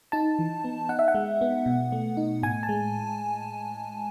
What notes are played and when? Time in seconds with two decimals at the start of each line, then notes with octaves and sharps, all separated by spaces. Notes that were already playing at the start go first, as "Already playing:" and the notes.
0.12 D#4 A5
0.39 E3
0.64 B3
0.89 D#4 F#5
0.99 E5
1.08 F#5
1.15 G#3
1.41 B3
1.66 B2
1.92 A3
2.17 D#4
2.43 A2 G#5
2.63 A5
2.69 G#3